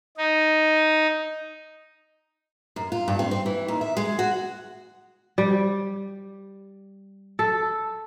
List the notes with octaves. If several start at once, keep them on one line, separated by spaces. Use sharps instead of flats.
D#4
F#2
F4
G2
C4
C4
E3
D#2
E5
G#3
F#4
G3
A4